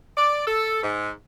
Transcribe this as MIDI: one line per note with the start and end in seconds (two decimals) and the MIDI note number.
0.17 0.45 74
0.47 0.81 69
0.83 1.11 44